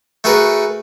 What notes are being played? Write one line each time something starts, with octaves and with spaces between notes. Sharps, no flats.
A3 F#4 G#4 A#4 B4